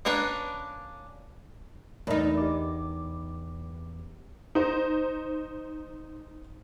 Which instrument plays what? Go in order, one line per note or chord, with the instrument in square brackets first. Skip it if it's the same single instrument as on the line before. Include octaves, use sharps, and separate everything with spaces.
[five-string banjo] A#3 C#4 D4 A#4 B4
[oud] E2 D#4 [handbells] A3 A#4 D5
[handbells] G4 D6
[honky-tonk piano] D#4 C5